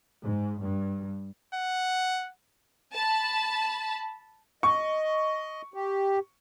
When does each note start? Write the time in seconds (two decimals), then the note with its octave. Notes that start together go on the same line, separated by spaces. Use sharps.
0.23 G#2
0.61 G2
1.54 F#5
2.94 A5 B5
4.63 D#5 C#6
5.74 G4